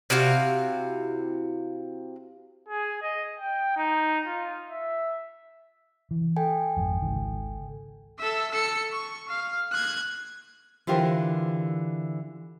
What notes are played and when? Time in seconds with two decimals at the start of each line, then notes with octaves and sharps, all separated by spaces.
0.10 C3 E4 F#4 F5
2.68 G#4
3.02 D#5
3.38 G5
3.76 D#4
4.26 F4
4.70 E5
6.11 E3
6.36 A4 G5 G#5
6.77 G#1 F2
7.02 G#1 C#2 D#3
8.19 A4 E5
8.52 A4 C#7
8.93 C#6
9.29 F5
9.71 F#6 G#6
10.87 D3 E3 F4 G4 A#4 C5